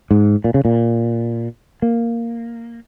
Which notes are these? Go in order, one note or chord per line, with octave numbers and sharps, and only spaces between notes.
G#2
A#2
C#3
A#2
A#3